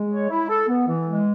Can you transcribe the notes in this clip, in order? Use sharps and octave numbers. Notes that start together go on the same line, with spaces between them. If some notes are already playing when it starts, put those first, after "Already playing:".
Already playing: G#3
C#5
E4
A4
B3
E3
G#3